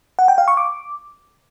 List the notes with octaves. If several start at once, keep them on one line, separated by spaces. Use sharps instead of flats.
F#5
G5
F5
C#6
D6